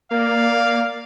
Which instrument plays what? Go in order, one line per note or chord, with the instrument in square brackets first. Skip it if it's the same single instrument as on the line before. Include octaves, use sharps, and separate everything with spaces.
[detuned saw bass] A#3 [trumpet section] D5 F5